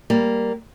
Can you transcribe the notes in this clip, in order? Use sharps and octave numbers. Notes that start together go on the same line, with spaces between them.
G3 A#3